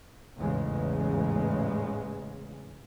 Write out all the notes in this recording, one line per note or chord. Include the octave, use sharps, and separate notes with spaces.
A1 E2 G#2 C#3 G#3